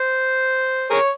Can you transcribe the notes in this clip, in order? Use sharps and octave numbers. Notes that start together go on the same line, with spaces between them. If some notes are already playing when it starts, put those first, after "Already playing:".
Already playing: C5
G#4 A#4 C#5